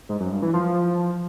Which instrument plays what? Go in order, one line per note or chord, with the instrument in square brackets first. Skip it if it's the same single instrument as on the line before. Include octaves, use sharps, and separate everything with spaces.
[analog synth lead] G#2
F#2
G2
E3
F3